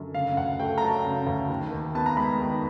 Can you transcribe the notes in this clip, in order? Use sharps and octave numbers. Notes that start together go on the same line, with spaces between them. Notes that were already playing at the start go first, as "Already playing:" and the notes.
Already playing: F#2 D3
C#3 F5
D2 F#5
A3 G5
A#5
F#3 A5
C#3
D2
D#3
D#2
B3 A5
A#5
G#3 B5
D#3